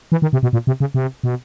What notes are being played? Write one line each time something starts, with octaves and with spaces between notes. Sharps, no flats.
E3
D#3
C3
B2
A#2
C3
C#3
C3
B2